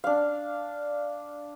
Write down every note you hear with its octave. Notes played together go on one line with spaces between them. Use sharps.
D4 F5